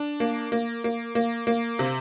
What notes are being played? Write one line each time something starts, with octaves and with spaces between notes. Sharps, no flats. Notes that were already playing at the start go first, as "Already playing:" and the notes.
Already playing: D4
A#3
A#3
A#3
A#3
A#3
C3